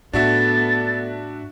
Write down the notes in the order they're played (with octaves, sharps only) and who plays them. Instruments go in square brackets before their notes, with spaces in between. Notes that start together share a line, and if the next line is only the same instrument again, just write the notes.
[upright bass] A2 [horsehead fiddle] B3 A4 [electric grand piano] D4 F#4 E5 [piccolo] A6